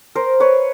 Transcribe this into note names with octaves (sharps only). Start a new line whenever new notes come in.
A#4 C5
B4 C#5